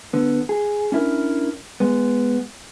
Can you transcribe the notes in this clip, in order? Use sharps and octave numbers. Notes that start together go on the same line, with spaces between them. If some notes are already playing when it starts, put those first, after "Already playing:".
D3 B3
G#4
C#4 D4 E4 G4 A#4
G#3 B3